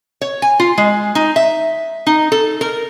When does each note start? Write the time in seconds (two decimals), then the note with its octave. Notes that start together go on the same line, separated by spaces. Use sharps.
0.21 C#5
0.42 G#5
0.60 F4
0.78 G#3
1.15 D#4
1.36 E5
2.07 D#4
2.32 A4
2.61 A#4